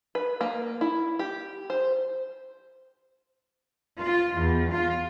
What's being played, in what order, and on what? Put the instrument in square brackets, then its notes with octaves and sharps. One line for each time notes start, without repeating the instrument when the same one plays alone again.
[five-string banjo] B4
A#3
E4
G4
C5
[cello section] F4
E2
F4